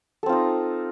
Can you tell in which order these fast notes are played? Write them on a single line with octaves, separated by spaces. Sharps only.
A4 C4 F4 D#4